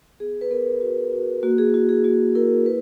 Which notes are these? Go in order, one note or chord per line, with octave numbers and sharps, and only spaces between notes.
B3 G#4
B4
B3 A#4
F#4
F#4
A#3 F#4
G#4
E4 F#4
G#4
A#3 F#4
E4 A#4
A#3 B4